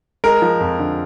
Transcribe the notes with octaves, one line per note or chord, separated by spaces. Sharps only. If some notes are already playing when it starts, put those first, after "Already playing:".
G#3 A#4
F3
F2
D3